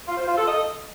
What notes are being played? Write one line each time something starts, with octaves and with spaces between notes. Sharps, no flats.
F4
C5
F4
A4
D#5